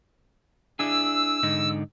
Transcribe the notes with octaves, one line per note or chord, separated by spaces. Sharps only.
D4 E4 G#4 E6
G#2 D3 D#4